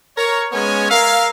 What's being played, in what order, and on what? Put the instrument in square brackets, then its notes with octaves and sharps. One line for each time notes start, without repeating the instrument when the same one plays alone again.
[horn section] A#4 C#5
G#3 B3 C#4 C#5 G#5
A#4 E5 F5